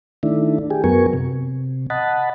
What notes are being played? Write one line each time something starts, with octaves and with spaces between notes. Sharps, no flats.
D#3 A3 D4 E4
G4 G#4
F#2 F#3 B3 A#4 G#5 C#6
C3
D#5 F#5 A5 B5